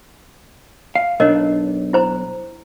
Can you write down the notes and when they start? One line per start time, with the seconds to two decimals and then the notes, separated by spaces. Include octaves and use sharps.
0.95 F5
1.20 B1 D4 A#4 C#5 D#5
1.93 E4 C5 A#5